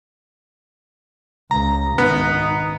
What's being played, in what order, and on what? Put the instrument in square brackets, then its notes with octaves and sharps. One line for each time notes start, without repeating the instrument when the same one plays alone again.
[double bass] C#2 [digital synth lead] A#5
[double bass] G#1 D#4 [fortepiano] B3